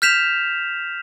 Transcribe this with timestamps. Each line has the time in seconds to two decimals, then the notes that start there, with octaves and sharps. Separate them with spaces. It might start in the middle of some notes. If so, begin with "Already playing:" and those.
0.02 F6 G6 B6 E7 F7